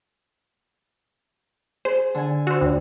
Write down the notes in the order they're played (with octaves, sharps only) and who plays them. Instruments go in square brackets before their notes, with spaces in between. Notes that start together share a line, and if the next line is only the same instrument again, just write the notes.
[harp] G#4 [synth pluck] C5
[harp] D3 G#5
[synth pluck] F#4 C5 [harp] E6
[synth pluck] D2